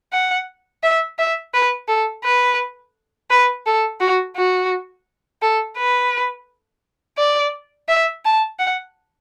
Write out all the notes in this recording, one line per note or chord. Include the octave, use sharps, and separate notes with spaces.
F#5
E5
E5
B4
A4
B4
B4
A4
F#4
F#4
A4
B4
D5
E5
A5
F#5